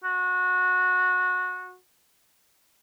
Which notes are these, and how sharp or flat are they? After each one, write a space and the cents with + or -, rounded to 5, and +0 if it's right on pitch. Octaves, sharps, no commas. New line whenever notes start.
F#4 -20